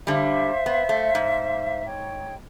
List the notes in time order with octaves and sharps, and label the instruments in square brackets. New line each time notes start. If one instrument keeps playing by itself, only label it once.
[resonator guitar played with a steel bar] D3 G3 [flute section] C5 E5 F5
[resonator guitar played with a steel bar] B3
A3
G#2
[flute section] C#5 G5